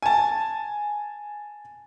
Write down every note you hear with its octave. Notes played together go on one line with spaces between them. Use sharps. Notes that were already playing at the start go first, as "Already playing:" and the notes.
G#5 A5